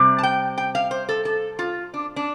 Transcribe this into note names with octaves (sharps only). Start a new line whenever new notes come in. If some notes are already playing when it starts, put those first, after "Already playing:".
Already playing: C3 G3 C4
A5
G5
G5
F5
C5
A4
A4
F4
D4
D4